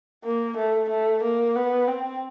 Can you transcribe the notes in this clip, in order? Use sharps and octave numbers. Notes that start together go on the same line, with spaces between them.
A#3
A3
A3
A#3
B3
C4